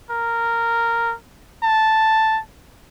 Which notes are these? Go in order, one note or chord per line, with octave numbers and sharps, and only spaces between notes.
A#4
A5